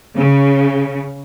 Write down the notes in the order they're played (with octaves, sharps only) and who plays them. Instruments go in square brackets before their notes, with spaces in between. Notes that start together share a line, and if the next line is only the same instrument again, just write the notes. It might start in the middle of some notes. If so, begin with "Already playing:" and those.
[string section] C#3